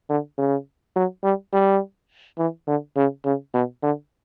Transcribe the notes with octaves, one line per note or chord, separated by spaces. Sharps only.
D3
C#3
F#3
G3
G3
E3
D3
C#3
C#3
B2
D3